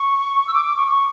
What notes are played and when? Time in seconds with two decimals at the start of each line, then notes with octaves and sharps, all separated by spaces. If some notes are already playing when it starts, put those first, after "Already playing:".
Already playing: C#6
0.47 E6
0.54 D6
0.65 D6
0.76 C#6
0.88 C#6